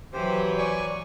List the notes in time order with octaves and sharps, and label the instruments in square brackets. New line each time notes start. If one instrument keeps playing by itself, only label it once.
[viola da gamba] E3 F#3 B4 [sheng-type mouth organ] G4 C5
[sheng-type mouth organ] D5 G#5 C#6